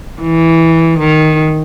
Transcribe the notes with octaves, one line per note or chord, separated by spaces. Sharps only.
E3
D#3